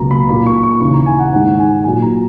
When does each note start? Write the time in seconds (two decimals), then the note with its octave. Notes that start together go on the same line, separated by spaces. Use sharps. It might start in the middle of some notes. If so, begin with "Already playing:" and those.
Already playing: C#2 B2 F#3 A#3 A#5
0.11 B5
0.29 A#2 A#3 B5
0.46 C#6
0.63 C#6
0.80 D#2 C#3 E3 C#6
0.93 A#5
1.06 G#5
1.19 F#5
1.33 G#2 D#3 G#3 F#5
1.59 G#5
1.84 A#2 F#3 A#3 G#5
2.02 A#5